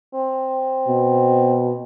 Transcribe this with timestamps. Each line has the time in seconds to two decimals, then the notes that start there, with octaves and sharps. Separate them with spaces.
0.15 C4
0.88 B2